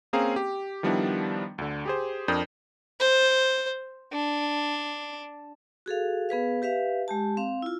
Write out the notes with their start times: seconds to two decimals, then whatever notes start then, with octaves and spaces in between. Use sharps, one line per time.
0.13 A#3 C4 C#4 G#4 F5 A#5
0.36 G4
0.83 D#3 F3 G3 B3 D4 E4
1.58 D2 D3
1.85 G4 G#4 C5
2.28 F2 D4 A#4 D#6 G6
3.00 C5
4.12 D4
5.86 F#4 G#4 A4 F5
6.29 B3 G#4 B4 F5
6.62 G4 B4 E5 F5
7.08 G#3 G4 A5
7.37 C4 F5
7.62 E4 F4